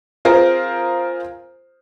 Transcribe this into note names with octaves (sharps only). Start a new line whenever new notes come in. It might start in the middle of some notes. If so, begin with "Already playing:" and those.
C4 F4 G#4 A#4 C5